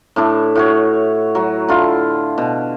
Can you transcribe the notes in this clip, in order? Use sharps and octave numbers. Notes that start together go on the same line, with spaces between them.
A2 D4 E4
A2 F#4 C#5
F#3 F#4
D3 E4 F4
B2